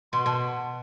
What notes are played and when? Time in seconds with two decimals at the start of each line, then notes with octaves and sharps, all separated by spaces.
0.13 B2 C6
0.26 B2 A5